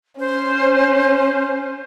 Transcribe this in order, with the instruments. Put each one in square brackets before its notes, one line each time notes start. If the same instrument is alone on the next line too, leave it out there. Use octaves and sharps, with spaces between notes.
[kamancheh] C#4 [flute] C5